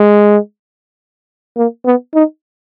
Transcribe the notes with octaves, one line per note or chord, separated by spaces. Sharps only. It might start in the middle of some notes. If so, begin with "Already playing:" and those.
Already playing: G#3
A#3
B3
D#4